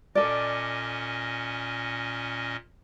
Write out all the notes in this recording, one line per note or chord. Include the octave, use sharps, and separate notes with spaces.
A#2 C#4 A4 D5 D#5